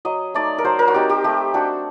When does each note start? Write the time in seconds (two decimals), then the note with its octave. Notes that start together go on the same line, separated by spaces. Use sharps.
0.05 F#3 D#5
0.34 A3 D#4 D5
0.58 A#4
0.64 F#3 C5
0.79 A#4
0.88 F#4
0.94 C4 D#4 G4
1.09 G4
1.24 A3 G4
1.54 D4 F#4